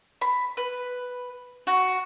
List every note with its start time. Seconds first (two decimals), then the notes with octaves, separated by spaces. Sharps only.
0.21 B5
0.57 B4
1.67 F#4